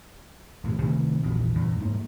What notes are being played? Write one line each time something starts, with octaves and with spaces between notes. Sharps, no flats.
B1 A2 E3
C3 D#3 A3 B3
A#1 E2 B2
E2 G2 A#2
G#2 A#3